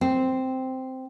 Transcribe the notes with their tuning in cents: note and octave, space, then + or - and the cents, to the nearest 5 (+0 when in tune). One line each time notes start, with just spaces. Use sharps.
C4 -5